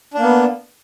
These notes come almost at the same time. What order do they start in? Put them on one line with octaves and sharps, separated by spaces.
D4 A#3 B3